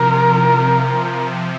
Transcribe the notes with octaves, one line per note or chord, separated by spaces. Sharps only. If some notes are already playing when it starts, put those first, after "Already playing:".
Already playing: C3 F3 A#4